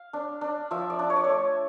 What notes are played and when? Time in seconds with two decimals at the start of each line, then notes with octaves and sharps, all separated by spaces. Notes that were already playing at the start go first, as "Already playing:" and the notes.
Already playing: F5
0.13 D4
0.41 D4
0.71 F3 E5
0.90 D5
0.99 D4
1.10 C#5
1.16 D5
1.24 C#5
1.29 A3